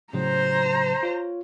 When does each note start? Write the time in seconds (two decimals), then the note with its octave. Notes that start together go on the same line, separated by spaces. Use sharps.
0.13 A2 C#3 F#3 C5 A#5
1.03 F4 C#5